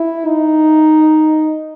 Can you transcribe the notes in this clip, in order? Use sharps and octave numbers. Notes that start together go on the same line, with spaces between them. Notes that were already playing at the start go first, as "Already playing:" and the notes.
Already playing: E4
D#4